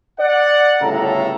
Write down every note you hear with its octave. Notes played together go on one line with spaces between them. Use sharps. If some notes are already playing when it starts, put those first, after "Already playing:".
D5 F#5
G1 A2 C#3 A4 A#5